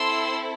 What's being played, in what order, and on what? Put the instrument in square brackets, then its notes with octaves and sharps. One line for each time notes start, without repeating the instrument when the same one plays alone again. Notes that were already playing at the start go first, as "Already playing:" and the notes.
Already playing: [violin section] C4 E4 A4 C6 E6